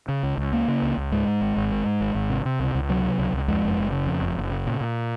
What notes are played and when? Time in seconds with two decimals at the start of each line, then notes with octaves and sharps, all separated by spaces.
0.08 C#3
0.23 C#2
0.38 C#2
0.52 C#3 A#3
0.68 C#3
0.82 C#2
0.97 C#2
1.12 G#2 G#3
1.27 G#2
1.41 G#1
1.56 G#1
1.71 G#2
1.86 G#2
2.01 G#1
2.15 G#1
2.30 C3
2.45 C3
2.60 C#2
2.75 C#2
2.89 C3 F#3
3.04 C3
3.18 C#2
3.33 C#2
3.48 F2 G#3
3.63 F#1
3.78 F#1
3.92 C#3
4.07 F2
4.22 F#1
4.37 F#1
4.51 C#3
4.66 A#2
4.81 A#2